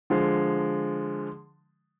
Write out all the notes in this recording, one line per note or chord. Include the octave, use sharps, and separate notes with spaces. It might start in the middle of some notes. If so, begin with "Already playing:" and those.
D3 F3 G#3